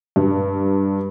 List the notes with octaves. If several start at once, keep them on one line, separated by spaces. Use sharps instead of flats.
G2